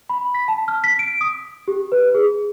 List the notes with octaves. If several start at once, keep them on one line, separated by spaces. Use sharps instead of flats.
B5
B6
A5
F6
B6
D7
D#6
G4
B4
G#4